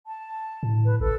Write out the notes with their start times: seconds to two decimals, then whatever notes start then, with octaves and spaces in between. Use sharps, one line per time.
0.07 A5
0.63 A2
0.85 B4
1.00 A1 A4